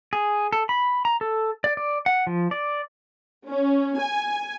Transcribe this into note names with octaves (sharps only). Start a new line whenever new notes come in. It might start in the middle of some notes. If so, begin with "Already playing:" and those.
G#4
A4
B5
A#5
A4
D5
D5
F#5
F3
D5
C#4
G#5